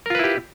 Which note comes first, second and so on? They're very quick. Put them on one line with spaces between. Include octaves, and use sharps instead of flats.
A#4 F4 B4 E4 G4